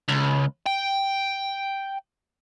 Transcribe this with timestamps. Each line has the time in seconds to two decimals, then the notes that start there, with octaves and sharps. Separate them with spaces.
0.09 C#2
0.66 G5